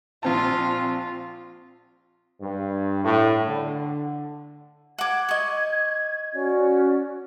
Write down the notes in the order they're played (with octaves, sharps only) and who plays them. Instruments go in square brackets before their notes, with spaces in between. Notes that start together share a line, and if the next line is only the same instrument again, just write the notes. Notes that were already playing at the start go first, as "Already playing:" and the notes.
[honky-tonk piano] A#1 C4 A5 [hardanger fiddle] F4
[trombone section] G2
A2
D3
[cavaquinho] F#5 D6 [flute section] G#6
[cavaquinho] D#5 C#6
[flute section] C#4 F#4 D5